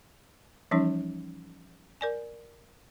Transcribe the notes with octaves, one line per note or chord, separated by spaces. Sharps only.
E3 F3 G3 C#4 D#4
A#4 D5 G#5